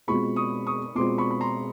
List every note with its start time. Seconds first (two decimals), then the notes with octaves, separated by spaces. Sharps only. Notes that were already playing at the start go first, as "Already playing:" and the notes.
0.08 B2 G#3 C4 F4 B5 C#6
0.36 C#6 D#6
0.67 C#6 D#6
0.95 B2 G#3 C4 F4 C6 D6
1.18 B5 C#6
1.31 B5
1.41 A#5 C6